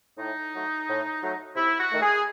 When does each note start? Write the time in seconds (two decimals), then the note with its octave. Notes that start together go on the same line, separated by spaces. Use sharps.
0.18 A2 D#4
0.53 F#3 A3
0.88 A2
1.22 F#3 A3
1.55 C3 E4
1.79 F#4
1.90 D#3 A3
2.01 G#4